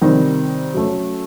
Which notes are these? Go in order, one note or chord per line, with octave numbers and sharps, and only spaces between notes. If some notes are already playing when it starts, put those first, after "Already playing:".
C3 D#3 G3 C4 D#4
F#3 A3 C#4